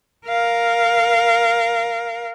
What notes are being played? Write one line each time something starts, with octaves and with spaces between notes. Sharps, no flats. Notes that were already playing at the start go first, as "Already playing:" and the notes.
A#4 F5